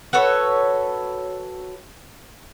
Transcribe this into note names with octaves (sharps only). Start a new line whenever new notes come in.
F#4 A4 B4 C#5